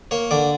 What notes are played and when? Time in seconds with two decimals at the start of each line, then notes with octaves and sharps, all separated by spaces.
0.11 A#3 C#5
0.31 D3 D5